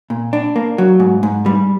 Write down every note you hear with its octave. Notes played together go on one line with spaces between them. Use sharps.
A#2
D4
A#3
F#3
G#2
G#2
G3